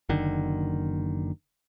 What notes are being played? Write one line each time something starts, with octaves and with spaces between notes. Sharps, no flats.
F#1 D3 D#3